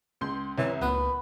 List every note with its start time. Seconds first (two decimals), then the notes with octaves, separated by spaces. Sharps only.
0.21 C#2 C6 G6
0.58 C2 E3 C#5
0.81 C#2 A#2 B3 D#4 B5